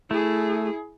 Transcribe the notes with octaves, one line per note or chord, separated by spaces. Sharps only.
A3 E4 G#4